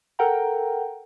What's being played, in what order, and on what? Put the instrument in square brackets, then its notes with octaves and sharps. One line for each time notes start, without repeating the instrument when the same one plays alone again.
[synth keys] A4 A#4 F#5 G5 A#5